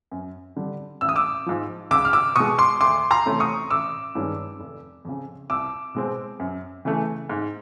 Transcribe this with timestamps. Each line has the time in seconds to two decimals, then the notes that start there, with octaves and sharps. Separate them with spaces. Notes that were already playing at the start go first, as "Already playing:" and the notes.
0.11 F#2
0.56 D3 G3
1.01 A1 E6
1.09 D#6
1.16 D6 E6
1.46 G#2 F3
1.91 C#2 D6 E6
2.05 F6
2.13 D6 E6
2.36 B2 G#3 C#6 D#6
2.58 C6 D6
2.81 D2 C6 D6
3.11 A#5 C6
3.26 C3 E3 A3 C#4
3.40 C#6 D#6
3.70 A1 D6 E6
4.15 G2 D#3 G#3 C#4
4.60 F1
5.05 F2 C#3
5.50 C2 D6 E6
5.95 B2 G#3 C4
6.40 F#2
6.85 C#3 E3 A3
7.30 G#2